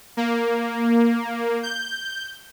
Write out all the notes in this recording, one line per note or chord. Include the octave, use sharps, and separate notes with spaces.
A#3
G6